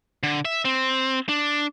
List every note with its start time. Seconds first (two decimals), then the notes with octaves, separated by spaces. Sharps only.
0.23 D3
0.45 E5
0.65 C4
1.29 D4